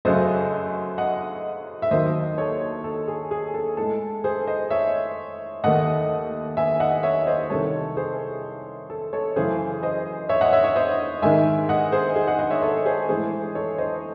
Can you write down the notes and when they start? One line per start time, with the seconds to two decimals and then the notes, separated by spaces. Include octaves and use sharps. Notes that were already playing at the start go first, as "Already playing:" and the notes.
0.05 F#2 C#3 F#3 A3 C5 D#5
0.98 D#5 F#5
1.82 E5
1.91 D#2 D#3 F#3 C5 D#5
2.38 A4 C#5
2.84 A4
3.08 G#4
3.31 G#4
3.54 A4
3.77 A2 G#3 A4
4.24 G#4 C5
4.47 C5 D#5
4.70 C#5 E5
5.64 D#2 D#3 A3 D#5 F#5
6.57 E5 G#5
6.80 D#5 F#5
7.03 C#5 E5
7.27 C5 D#5
7.50 C2 C3 D#3 A4 C#5
7.96 G#4 C5
8.90 A4
9.13 A4 C#5
9.36 F#2 C#3 E3 A3 G#4 C5
9.83 C5 D#5
10.29 C#5 E5
10.41 D#5 F#5
10.53 C#5 E5
10.64 C#5 E5
10.76 C5 D#5
11.22 G#2 D#3 G#3 E5 G#5
11.69 D#5 F#5
11.92 G#4 C5
12.16 G#4
12.27 D#5 F#5
12.39 D#5 F#5
12.50 C#5 E5
12.62 A4 C#5
12.85 G#4 C5
13.09 A2 E3 G#3 G#4 C5
13.55 A4 C#5
13.78 C5 D#5